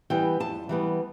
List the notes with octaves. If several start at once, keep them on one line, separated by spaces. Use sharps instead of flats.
E3 G3 B3 G5
F2 A5
E3 G3 B3